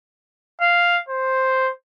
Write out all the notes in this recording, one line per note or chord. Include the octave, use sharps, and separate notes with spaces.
F5
C5